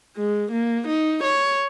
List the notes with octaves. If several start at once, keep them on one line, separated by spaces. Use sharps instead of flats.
G#3
A#3
D#4
C#5